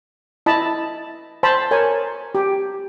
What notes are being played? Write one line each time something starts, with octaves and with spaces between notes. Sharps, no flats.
E4 D#5 A5 B5
C5 A5 B5
A#4 C#5 G#5
G4